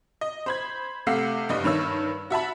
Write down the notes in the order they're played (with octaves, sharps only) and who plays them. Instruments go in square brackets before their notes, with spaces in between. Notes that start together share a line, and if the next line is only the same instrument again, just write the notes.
[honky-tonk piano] D#5
C5 B5 G#6
C3 A3 F5 F#5 E6 C7
F#1 G2 G3 D#5
G2 D#3 C#5 E6
F#4 E5 A5 B5